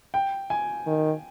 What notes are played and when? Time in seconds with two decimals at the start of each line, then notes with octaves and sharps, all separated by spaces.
0.14 G5
0.50 G#5
0.87 D#3